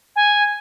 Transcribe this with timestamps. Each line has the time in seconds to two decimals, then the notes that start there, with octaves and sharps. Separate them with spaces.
0.16 G#5